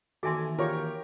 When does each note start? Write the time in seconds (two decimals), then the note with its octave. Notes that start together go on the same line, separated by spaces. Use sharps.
0.23 D#2 E3 F#4 A4 E5 G#5 C6 D6
0.59 F4 G4 A#4 C#5 C#6